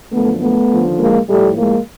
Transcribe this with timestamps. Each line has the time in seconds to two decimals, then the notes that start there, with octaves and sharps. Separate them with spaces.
0.12 F#2 D3 F3 A3 B3
0.41 A3 B3
0.71 D#2 D3 F3
0.99 G#3 A#3
1.28 A2 F3 G3 A3
1.58 G#3 A#3